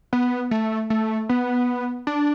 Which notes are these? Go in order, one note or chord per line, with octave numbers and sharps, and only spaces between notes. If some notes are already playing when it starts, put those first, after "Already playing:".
B3
A3
A3
B3
D4